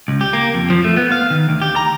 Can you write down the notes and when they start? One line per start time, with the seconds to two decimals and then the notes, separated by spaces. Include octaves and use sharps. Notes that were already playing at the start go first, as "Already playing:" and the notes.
0.08 C#2
0.21 G4
0.33 A#3
0.54 F2
0.70 F3
0.84 A3
0.97 B3
1.12 F5
1.30 D#3
1.49 D2
1.62 G4
1.76 A#5